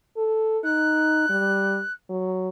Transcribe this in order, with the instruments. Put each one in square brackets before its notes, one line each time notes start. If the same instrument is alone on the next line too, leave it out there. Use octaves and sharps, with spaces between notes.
[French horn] A4
[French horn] D#4 [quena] F#6
[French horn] G3
F#3